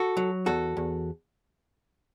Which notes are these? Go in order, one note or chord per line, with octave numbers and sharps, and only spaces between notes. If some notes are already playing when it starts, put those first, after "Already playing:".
Already playing: F#4 A4
F#3
E2 F#4 A4
E2